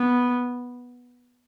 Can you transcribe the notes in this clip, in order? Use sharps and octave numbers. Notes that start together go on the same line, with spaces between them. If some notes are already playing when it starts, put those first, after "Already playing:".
Already playing: B3